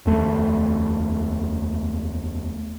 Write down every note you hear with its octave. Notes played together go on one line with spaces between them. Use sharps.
F1 D#2 A3